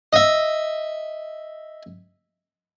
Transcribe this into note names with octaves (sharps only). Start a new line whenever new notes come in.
D#5 E5